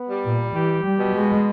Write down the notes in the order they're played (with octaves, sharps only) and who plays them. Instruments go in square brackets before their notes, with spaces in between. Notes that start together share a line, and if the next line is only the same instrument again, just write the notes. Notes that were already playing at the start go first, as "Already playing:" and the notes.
Already playing: [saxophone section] B3
G3
[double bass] A#2
[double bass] E3 [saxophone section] G4
[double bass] G3
[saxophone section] B2
[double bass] G#3